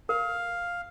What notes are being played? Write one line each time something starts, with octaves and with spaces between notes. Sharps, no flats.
A#4 F5